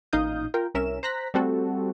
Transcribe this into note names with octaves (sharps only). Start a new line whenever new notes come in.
A1 A#2 D#4 F5 D#6 G6
F4 A#4 G5
C2 C#4 A#4 E5 E7
C5 A#5 F#6 A#6 B6
G3 A3 C4 F#4 A4